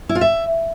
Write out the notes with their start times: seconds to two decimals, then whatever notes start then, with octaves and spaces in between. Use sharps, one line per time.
0.09 E4
0.15 F4
0.21 E5